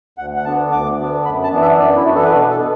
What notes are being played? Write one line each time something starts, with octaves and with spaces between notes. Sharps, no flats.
D2 F#5
F#5
D3 B3 D4 A5
D2 D6
D3 B3 D4
F#2 B5
A5
E3 B3 D4
E5
F#2 D5
E4
E3 B3 D4 F#4
A4
B4
B2 D5
A4
B3